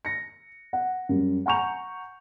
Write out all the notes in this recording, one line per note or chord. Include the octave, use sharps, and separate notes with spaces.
A#6 C#7
F#5
F#2 G3
F#5 G#5 A#5 C#6 G6 F7